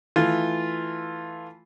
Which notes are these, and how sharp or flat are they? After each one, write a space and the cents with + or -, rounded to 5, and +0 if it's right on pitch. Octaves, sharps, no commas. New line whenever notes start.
E3 +0 A3 +0 F4 +0